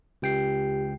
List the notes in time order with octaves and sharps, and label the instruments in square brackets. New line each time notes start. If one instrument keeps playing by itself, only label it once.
[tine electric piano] C#2 G5 C7 [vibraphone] G4